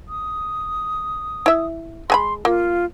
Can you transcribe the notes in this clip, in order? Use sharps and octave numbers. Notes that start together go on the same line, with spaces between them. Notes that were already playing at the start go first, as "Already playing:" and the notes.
D#6
E4 E5
G#3 G#5 B5 C6
A#3 F4